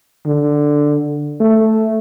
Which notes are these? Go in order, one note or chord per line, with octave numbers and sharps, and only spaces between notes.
D3
A3